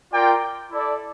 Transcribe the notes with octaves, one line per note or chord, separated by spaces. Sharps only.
F4 A#4 D5 G5
E4 A4 D5